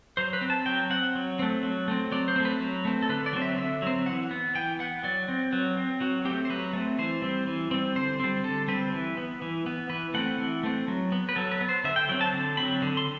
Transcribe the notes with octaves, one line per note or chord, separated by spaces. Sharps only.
F#3 C5
B4
C4
A5
F#3 G5
C4 F#5
F#3
A3 C4
F#3
A3 C4
F#3 D5
C5
A3 C4
B4
F#3
A3 C4
A4
D3 B4
D5
F#3 C4
E5
D3 E5
F#3 C4
E3 F#5
B3
E3 G5
B3 F#5
F#3 D5
C4
F#3 B4
C4
F#3 F#4
A3 C4 G4
C5
F#3 B4
A3 C4
E3 C5
G3 C4
E3
G3 C4
D3 C5
G3 C4
D3 A4
G3 C4 B4
E3
B3
E3
B3
E3 B4
A3 C4 F#5
E3
A3 C4
F#3
B3
B4
F#3 A4
B4
B3
C5
D3 E5
G5
F#3 C4 G5
A5
D3 A5
F#3 C4 B5
D3
C6